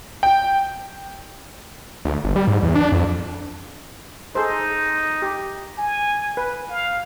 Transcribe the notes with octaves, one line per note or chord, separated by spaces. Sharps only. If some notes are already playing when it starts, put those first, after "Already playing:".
G5
D2
G1
G3
G#2
E2
D4
F2
D#4 G#4 A4 C5
G4
G#5
B4
F5